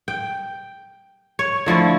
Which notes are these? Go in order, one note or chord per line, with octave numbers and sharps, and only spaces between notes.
G5
C#5
D3 F3 A3 E4